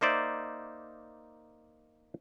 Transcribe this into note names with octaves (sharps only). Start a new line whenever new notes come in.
A#3 D#4 C5 D5 E5